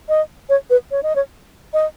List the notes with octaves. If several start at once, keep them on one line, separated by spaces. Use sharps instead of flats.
D#5
C#5
B4
C#5
D#5
C#5
D#5